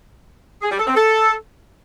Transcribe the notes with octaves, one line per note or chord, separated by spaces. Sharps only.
G#4
G3
A4
C4
A4